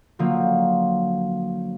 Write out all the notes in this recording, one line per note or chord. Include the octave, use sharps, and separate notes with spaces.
D3 F3 F#3 A#3